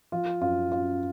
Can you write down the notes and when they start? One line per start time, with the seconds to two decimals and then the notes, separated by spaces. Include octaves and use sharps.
0.12 F3 F4
0.41 F#2 F4
0.72 F#2 F4